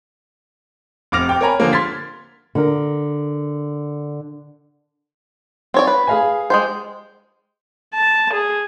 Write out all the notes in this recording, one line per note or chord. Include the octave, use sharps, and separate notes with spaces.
F1 C3 D6 F6 A#6 F7
G5 D6
A#4 C#5 G#5 A#5 B5
D3 F3 A#3
C6 F6 G#6 A6 B6
D3 A#4
C4 C#5 D5
B4
G#4 F5 G#5
G#3 G4 C5
A5
G#4